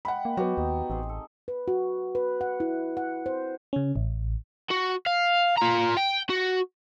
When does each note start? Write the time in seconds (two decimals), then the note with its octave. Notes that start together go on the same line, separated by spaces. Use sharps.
0.05 G#3 F#5 G5 B5
0.25 A#3
0.37 F#3 B3 F#4 G4
0.58 D#2 D#4
0.90 A1 C4 G#4
1.09 A4
1.48 B4
1.68 F#4
2.15 B4
2.41 F#5
2.60 E4
2.97 F#5
3.26 C5
3.73 C#3 C#4
3.96 A1
4.70 F#4
5.06 F5
5.57 F4 A#5
5.97 G5
6.30 F#4